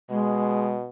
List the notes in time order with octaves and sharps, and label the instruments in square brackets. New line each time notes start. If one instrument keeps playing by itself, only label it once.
[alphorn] B2 [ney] G#3